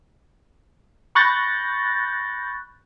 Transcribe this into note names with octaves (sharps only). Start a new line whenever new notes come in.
B5 C#6 F#6 G6 A6 A#6